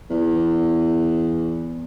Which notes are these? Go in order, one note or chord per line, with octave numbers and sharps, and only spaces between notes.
E2